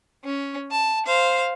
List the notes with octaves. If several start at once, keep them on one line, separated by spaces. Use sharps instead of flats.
C#4
A5
C5 F5